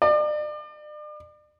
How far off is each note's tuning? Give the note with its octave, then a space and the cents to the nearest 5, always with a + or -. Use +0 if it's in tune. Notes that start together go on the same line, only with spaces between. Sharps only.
D5 +40